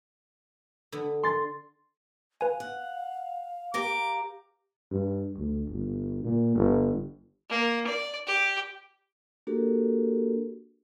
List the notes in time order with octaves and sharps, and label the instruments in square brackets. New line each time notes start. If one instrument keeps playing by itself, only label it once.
[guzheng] D3 B3
[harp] C6 A6
[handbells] B4 G#5 [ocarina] F5
[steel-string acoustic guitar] F#5
[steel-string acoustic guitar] G4 A#4 A#5 [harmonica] D6
[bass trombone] G2
D2
G1
A#2
G1
[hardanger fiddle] A#3
D5
G4
[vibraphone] A#3 D4 F#4 G4 A4 A#4